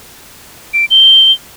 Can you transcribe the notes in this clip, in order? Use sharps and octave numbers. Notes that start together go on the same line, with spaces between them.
D7
G7